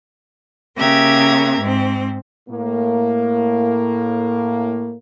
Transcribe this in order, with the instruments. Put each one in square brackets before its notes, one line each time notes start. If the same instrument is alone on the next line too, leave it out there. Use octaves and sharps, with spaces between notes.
[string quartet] C#3 A#3 G4 E5 A#5 G#6
G#2 C4
[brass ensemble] A2 A#3